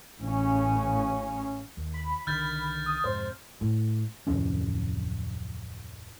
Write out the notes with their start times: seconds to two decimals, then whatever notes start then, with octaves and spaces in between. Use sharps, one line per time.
0.19 A1 C#3 C#4
1.77 D#2
1.94 B5
2.27 C2 D3 D#3 F6 G6 A6
2.86 D#6
3.04 F2 G#2 C3 C5
3.61 A2
4.27 D1 F2 C3 C#4